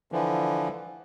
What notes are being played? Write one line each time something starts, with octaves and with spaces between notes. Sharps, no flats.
D3 E3 F3